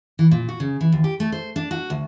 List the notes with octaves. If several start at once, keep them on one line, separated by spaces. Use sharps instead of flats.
E3
A#2
F#4
C#3
E3
D#2
G4
A3
C5
D4
F#4
D2